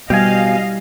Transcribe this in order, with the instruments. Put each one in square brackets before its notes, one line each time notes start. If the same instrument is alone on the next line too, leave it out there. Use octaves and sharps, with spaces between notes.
[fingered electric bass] B2 [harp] G3 E4 [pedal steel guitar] G4 G#5 [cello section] D#5 F5